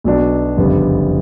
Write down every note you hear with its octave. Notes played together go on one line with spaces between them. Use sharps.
B1 B2 F#3 B3 D4
F#1 F2 D3 G3 B3